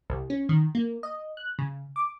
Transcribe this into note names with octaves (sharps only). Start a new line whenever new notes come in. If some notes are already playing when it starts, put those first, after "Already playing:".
C2
C#4
D#3
A#3
D#5
F#6
C#3
D6